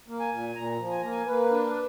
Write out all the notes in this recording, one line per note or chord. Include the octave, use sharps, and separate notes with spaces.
A#3
G#5
A#2
A#2 A#5
F3
G#5
A#3 A#5
G#5
A#3 B4
D4